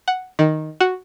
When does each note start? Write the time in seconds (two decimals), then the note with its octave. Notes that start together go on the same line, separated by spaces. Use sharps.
0.08 F#5
0.39 D#3
0.80 F#4